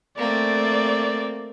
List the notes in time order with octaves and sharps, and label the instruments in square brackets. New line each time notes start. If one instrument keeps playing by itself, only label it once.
[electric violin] A3 D5 [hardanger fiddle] A#3 C4